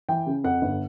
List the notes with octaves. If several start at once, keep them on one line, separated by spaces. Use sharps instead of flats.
E3 G5
C#3
F2 F#5
G1